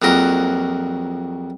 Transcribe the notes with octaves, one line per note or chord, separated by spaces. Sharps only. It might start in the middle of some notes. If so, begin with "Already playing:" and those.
A#1 F2 F#3 A#4